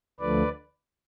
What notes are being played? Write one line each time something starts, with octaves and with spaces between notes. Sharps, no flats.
D2 D3 F3 A3 B4 D5